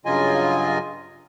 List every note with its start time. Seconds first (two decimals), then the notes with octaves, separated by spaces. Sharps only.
0.05 G2 C#3 F#3 F4 D#5 G#5